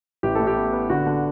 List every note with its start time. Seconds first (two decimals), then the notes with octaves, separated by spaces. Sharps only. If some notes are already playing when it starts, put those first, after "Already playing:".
0.23 A1 G4
0.35 A2 A4
0.47 G4
0.56 B3
0.73 B3
0.90 D3 F#4
1.06 D3